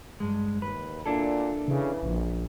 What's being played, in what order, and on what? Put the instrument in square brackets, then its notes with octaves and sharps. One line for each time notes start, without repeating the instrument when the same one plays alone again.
[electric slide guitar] G2 G#3
[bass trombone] D#2 [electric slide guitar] B4
[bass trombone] A#2 [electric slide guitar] D4 E4 A4
[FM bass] C#3 [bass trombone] E3
[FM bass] A#1